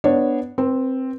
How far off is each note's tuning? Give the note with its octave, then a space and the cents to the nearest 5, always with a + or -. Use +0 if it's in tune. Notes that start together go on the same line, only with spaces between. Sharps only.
B3 +0 D4 +0 C#5 -15
C4 +0 B4 -25